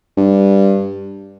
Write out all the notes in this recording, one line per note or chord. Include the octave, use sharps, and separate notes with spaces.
G2